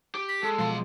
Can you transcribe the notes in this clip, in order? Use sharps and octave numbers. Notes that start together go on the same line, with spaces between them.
G4
B6
G#3 A4
B2 F3 F#3 G#3 F5 C6